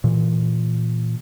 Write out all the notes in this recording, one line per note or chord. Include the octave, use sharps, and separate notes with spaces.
A#2 E3